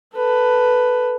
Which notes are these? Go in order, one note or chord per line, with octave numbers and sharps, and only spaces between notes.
A4 B4